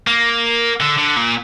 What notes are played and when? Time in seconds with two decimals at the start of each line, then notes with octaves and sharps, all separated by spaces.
0.07 A#3
0.81 D3
0.98 D3
1.17 A#2